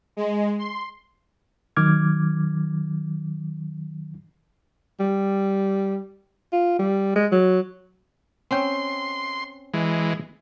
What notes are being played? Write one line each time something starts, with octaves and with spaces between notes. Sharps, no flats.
G#3
C6
D#3 F#3 D6 F6 G#6
G3
F4
G3
G#3
F#3
C4 C#4 G5 C6
E3 G#3